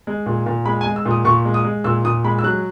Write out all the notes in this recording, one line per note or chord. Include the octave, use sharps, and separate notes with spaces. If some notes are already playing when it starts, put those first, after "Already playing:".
G#3
A#2
A#2
G#3 B5
G#5
G#3
E6
A#2
D#6
A#2 C#6
G#3
D#6
G#3
A#2 E6
A#2 D#6
G#3 B5
E6
F#3 F#6